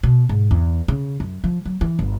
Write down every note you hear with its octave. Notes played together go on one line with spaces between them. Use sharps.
B2
G#2
E2
C#3
F#2
F3
F#3
E3
G1